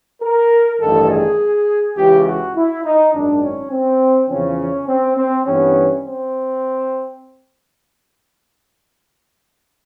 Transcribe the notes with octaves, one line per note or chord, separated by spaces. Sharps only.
A#4
A1 G2 D#3 A4
G#4
C#2 C#3 E3 G4
F#4
E4
D#4
G#1 F#2 D#3 D4
C#4
C4
E2 C#3 F3 C#4
C4
C4
G2 E3 G3 B3 C#4
C4